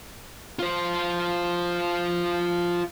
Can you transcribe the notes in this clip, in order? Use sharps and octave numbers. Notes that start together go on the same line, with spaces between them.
F4 C5